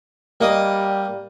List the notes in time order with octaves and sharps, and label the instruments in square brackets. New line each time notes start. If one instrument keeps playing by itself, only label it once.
[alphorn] G3 [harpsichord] A#3 D#5